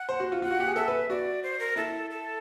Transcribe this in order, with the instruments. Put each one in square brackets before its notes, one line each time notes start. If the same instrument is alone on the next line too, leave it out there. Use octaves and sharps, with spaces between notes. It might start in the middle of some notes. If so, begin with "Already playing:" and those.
Already playing: [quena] F#5
[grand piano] C5
F#4
F4
[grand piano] F4 [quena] F#5
[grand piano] F#4
G4
G#4
[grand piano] A4 [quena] E5
[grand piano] B4
[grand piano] F#4 [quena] D5
[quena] C5
A#4
[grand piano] E4 [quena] A4
[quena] A4